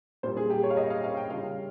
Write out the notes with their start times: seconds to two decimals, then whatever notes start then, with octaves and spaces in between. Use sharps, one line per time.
0.23 A#2 G3 A#3 F4 C5
0.37 G#4
0.50 G4
0.63 C#5
0.70 F5
0.77 D#5
0.90 F5
1.04 F5
1.17 G5
1.30 C#3 G3 C#4 F4 F5